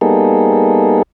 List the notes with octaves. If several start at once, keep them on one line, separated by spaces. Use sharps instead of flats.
G3 A#3 B3 D#4 G#4 A4